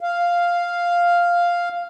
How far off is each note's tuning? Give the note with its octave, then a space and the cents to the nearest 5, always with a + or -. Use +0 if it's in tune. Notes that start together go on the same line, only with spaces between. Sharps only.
F5 +0